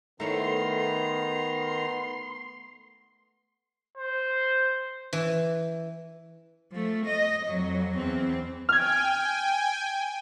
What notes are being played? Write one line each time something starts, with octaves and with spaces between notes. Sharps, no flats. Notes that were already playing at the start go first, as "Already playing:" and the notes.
D#3 A3 B3 E4 C#5 A#5 C6
C5
E3
F3 A3
D#5
F2 F#3
E2 C4
G5 G#5 F6 G#6